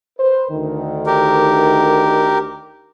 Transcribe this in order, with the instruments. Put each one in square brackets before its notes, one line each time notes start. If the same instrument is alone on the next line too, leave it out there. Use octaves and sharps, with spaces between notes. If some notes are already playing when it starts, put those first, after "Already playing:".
[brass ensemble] B4 C5
D2 D3 D#3
[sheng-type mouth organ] G4 A#4